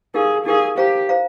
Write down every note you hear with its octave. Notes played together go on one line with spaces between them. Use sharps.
D#4 G4 G#4 A#4 F5
D#4 G4 G#4 A#4 F5
G4 C5 F5 A#5
C5 F5 A#5